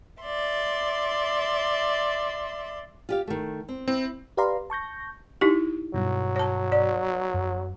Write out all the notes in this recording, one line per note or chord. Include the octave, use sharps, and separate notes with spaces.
D5 E5 C6
F4 G4 F5
D#3 A3
C4
C4 E4
G4 B4 D5 F5 A#5 C6
A5 C#6 G6 A#6
D#4 E4 G4
G2 B2 F#3
C#5 A5
D5
F#2